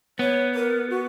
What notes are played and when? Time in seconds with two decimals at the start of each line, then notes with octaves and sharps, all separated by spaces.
0.19 B3 C#5
0.55 A#4
0.90 F#4